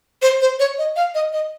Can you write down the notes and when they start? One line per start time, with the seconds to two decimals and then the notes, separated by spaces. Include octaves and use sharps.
0.22 C5
0.41 C5
0.60 C#5
0.78 D#5
0.96 F5
1.15 D#5
1.33 D#5